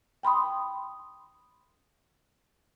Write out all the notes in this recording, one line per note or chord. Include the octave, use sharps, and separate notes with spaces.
G5 B5 C6 D#6